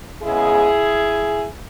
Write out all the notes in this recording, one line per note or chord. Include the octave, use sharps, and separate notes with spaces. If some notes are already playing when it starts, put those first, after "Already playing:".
C#3 G#3 B3 E4 G#4